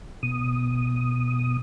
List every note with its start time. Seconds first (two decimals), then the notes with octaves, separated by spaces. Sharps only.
0.23 B2 D#6